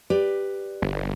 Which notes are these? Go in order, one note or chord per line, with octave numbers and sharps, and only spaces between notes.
G4 B4 D5
G1